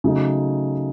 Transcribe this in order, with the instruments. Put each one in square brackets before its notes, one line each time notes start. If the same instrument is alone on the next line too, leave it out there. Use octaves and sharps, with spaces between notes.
[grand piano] C#3 F#3 A3 D#4